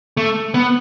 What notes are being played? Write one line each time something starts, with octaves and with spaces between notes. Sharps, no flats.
A3
B3